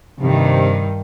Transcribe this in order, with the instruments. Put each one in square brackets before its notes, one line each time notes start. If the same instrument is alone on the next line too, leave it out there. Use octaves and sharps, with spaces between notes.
[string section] G2 D#3 [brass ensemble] C3